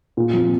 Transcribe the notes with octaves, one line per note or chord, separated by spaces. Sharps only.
A#2
F3 C4